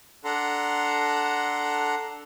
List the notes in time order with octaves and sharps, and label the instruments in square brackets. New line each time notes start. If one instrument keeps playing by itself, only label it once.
[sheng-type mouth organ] D4 A4 F#5 A#5 C6